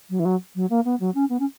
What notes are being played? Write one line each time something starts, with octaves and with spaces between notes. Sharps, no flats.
F#3
E3
F#3
F#3
A#3
B3
F#3
C#4
B3
C#4